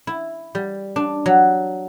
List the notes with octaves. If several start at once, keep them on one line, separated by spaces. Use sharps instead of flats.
E4
G3
D4
F#3